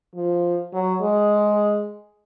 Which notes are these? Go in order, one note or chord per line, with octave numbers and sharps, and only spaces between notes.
F3
F#3
G#3